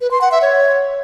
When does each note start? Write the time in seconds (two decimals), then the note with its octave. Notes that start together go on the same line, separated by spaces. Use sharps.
0.01 B4
0.11 C6
0.21 F#5
0.32 E5
0.42 C#5